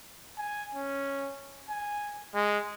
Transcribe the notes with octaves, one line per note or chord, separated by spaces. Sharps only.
G#5
C#4
G#5
G#3